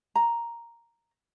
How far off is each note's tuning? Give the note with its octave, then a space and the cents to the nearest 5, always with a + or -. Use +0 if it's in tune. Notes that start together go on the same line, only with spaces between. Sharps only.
A#5 +0